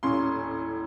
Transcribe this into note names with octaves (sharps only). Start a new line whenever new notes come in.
D#1 A2 C#4 C6